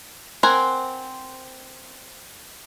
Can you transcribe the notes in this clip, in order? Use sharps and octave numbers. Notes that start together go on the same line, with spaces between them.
C4 A#4 C5 F#5 G#5